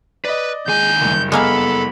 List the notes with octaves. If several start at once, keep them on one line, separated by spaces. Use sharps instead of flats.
B4 D5 D#5
D#2 G#3 G#5 G6
F#1 G2
G#3 A#3 B3 A4 F5 B5